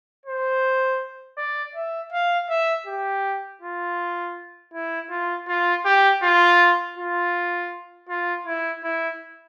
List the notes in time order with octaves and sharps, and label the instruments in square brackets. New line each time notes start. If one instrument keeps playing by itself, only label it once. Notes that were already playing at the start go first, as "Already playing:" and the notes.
[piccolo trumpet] C5
D5
E5
F5
E5
G4
F4
E4
F4
F4
G4
F4
F4
F4
E4
E4